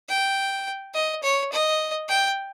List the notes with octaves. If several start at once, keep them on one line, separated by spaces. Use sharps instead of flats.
G5
D#5
C#5
D#5
G5